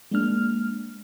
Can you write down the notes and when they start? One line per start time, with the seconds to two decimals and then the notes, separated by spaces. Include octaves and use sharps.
0.11 G#3 A#3 D4 F6